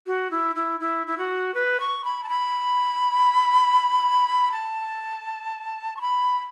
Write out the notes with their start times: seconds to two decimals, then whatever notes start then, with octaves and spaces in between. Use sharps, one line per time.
0.07 F#4
0.31 E4
0.56 E4
0.80 E4
1.07 E4
1.18 F#4
1.54 B4
1.80 C#6
2.04 B5
2.24 A5
2.29 B5
4.52 A5
5.97 C#6
6.01 B5